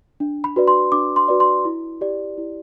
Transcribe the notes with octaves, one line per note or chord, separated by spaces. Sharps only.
D4
B5
F#4 B4 D5
C6
D4 D6
C6
F#4 B4 D5
C6
E4
G4 D5
E4